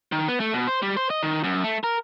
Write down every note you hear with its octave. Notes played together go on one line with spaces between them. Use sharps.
D#3
B3
A3
B2
C5
G3
C5
D#5
D#3
F#2
A3
A#4